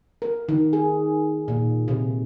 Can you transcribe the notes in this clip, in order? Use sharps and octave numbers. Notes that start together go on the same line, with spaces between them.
A#4
D#3
G#4
A#2
C3